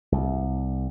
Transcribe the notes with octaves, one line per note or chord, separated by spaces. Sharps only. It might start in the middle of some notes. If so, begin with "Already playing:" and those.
C2